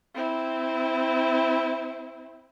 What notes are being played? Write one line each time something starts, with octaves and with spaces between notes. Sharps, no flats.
C4 E4